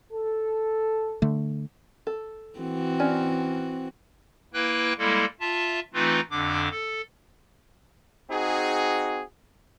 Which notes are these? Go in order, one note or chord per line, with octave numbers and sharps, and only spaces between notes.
A4
D3 A3
A4
E3 C4 F#4
C#4 D5
A#3 E4 B4 G5 F#6
G3 G#3 A#3 E4 A4
F4 E5 A5
E3 A3 C4 D#4 F4 B4
F2 D3 D4 D6
A4
C4 D#4 F#4 G#4